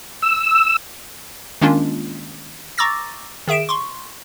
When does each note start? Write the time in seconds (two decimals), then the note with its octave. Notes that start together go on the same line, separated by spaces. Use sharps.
0.22 E6
1.61 D#3 G#3 A#3 C#4 D4 F4
2.78 A#5 C#6 D6 E6 A6 A#6
3.47 D#3 G#4 E5 D7 E7
3.69 C6 C#6